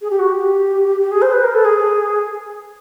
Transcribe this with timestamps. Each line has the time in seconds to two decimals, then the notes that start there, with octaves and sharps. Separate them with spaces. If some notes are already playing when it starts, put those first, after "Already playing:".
0.02 G#4
0.10 G4
0.19 F#4
0.29 G4
1.01 G4
1.12 G#4
1.22 C5
1.33 B4
1.43 A#4
1.55 A4
1.65 G#4